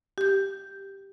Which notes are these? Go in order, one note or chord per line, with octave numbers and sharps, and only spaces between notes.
G4 G6